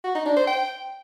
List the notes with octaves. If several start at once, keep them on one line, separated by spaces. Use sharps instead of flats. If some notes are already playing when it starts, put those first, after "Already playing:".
F#4
D#4
D4
C5
G5